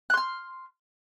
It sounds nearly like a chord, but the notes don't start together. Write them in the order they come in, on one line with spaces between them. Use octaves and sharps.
F#6 C6 F6